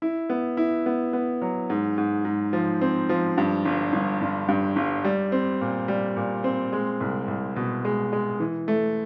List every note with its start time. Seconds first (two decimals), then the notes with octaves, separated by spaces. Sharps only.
0.02 E4
0.30 B3
0.57 E4
0.86 B3
1.13 B3
1.42 F#3
1.70 G#2
1.98 G#2
2.25 G#2
2.53 F3
2.81 C4
3.09 F3
3.38 G2
3.65 G1
3.93 G1
4.21 G1
4.48 G2
4.76 G1
5.05 G3
5.32 C4
5.61 A#2
5.88 G3
6.17 A#2
6.44 C4
6.73 G#3
7.00 C2
7.28 C2
7.56 B2
7.85 G#3
8.13 G#3
8.40 E3
8.68 A3